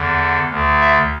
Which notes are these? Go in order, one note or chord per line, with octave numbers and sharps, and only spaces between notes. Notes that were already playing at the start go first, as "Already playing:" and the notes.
Already playing: E2 D3
D2 D3
E5